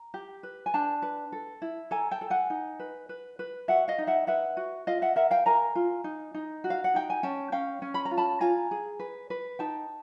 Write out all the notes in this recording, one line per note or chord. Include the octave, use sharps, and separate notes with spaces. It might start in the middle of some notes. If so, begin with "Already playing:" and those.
Already playing: A#5
G4
B4
G#5
D4 G5 A5
B4
A4
E4
A4 G#5 A#5
G5 A5
A4
F#5 G#5
D#4
B4
B4
B4
F#4 E5 F#5
D#5 F5
D#4
E5 F#5
B4 E5 F#5
F#4
F4 D#5 F5
E5 F#5
A#4 E5 F#5
F5 G5
A#4 G#5 A#5
F4
D#4
D#4
F#4
F5
F#5
D#4 G5
G#5
C#4 G5 A5
C#4 F5 G5
C#4
B5
A#5
F4
A5 B5
F4 G#5 A#5
G#4
B4
B4
D#4 G5 A5